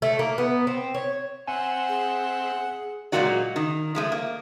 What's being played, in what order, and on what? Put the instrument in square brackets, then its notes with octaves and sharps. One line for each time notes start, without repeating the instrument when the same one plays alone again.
[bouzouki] A3
A#3
B3
C4
C#5
[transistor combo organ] C4 E5 [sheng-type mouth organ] F#5 [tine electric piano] G#5
[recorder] G#4
[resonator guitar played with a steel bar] A#2 F#3 G#3 A#3 F#4 D5
D#3
F3 G#3 A3
A#3